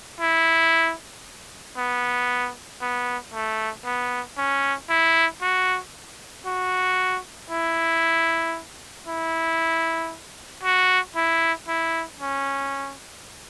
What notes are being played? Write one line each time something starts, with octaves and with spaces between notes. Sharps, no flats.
E4
B3
B3
A3
B3
C#4
E4
F#4
F#4
E4
E4
F#4
E4
E4
C#4